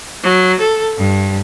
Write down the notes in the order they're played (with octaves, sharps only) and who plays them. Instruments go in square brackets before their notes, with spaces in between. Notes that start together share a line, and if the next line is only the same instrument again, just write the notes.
[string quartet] F#3
A4
G2